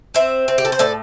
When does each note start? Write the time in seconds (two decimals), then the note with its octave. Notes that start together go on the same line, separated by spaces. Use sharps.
0.14 C4 C5 E5
0.48 C4
0.58 G4
0.65 A4
0.72 C5
0.79 A2 A4 D5